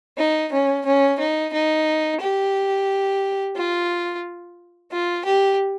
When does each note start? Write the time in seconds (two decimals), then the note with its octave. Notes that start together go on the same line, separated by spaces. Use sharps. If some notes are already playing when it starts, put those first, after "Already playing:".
0.18 D#4
0.52 C#4
0.85 C#4
1.19 D#4
1.53 D#4
2.21 G4
3.56 F4
4.92 F4
5.25 G4